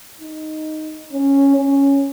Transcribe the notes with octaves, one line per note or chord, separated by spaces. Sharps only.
D#4
C#4
C#4